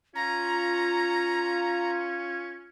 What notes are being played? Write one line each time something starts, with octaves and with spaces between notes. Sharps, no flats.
C#4 F4 A#5